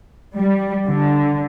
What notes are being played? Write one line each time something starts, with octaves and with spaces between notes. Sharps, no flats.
G3
D3